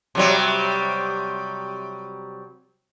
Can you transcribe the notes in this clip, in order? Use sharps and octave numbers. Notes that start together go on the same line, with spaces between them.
C3 F#3 G3